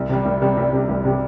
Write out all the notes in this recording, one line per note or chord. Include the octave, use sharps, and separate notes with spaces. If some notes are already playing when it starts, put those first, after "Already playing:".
Already playing: C2
C3 G3
C2
C3 G3
C2
C3 G3
C2
C3 G3